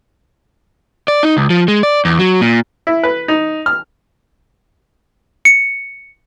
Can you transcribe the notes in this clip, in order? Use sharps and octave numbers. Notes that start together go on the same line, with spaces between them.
D5
D#4
C#2
F3
G#3
D5
E2
F#3
A#2
E4
B4
D#4
F6
C#7